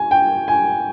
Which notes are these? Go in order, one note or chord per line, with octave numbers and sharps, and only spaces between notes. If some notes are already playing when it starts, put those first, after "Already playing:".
Already playing: G#5
G5
G#5